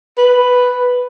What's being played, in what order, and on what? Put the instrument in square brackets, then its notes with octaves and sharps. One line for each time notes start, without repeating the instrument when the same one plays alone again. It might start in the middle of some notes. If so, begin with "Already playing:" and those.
[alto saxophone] B4